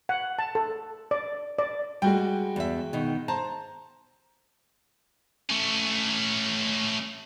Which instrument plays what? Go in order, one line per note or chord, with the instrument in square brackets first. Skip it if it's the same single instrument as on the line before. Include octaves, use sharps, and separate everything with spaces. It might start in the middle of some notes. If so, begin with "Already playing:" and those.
[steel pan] F#5
A5
A4
D5
D5
[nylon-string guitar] G3 [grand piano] G#3 F#4 G5
[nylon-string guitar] E2 E5
B2 D#3
[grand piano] C5 A#5 [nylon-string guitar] A5
[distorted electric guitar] A3 C#4